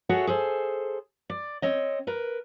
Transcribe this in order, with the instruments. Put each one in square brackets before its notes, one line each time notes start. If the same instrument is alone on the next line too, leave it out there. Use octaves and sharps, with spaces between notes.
[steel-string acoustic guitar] F#4 G#4 A4 C#5 E5 F#5
G#4 A4 C5
D5
C4 C#5 D#5
A#4 B4